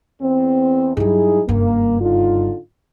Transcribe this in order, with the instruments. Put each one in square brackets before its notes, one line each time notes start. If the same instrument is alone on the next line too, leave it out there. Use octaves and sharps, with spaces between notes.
[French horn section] E2 C4
[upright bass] G2 F#3 [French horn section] D#4 E4 G#4
[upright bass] F#1 G2 [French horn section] A#3
[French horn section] D3 D#4 F4